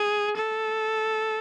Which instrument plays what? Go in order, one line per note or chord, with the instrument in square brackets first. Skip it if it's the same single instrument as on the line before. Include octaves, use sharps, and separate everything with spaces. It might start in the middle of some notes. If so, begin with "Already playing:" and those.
Already playing: [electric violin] G#4
A4